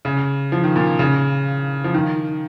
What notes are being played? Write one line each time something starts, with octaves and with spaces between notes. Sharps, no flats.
C#3
F3
D#3
A#2
C#3
F3
D#3